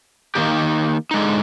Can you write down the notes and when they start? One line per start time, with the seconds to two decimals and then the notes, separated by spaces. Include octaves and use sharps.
0.35 D#3 A#3 D#4 G4
1.11 D3 G#3 D#4